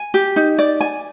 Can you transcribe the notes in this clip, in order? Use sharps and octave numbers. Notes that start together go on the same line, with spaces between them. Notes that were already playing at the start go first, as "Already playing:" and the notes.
Already playing: G#5
G4
D#4
D5
G#5